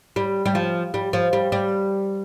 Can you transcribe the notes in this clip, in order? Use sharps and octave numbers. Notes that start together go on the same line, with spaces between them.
G3
G3
F3
G3
F3
G3
G3